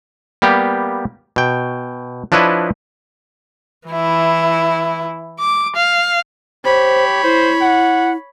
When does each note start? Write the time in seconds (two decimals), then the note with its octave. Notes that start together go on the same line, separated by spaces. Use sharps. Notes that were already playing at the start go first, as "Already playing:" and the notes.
0.42 G3 A#3 B3 G4
1.36 B2 G5
2.32 F3 D4 E4 B4 C#5 D#5
3.88 E3 E4
5.40 D6
5.76 F5
6.65 G4 C5 C#5 B5
7.23 E4 C5
7.61 F#5